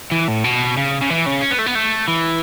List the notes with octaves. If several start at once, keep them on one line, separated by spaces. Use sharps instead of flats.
E3
A2
B2
C#3
C#3
E3
C#3
C#4
B3
A3
B3
A3
E3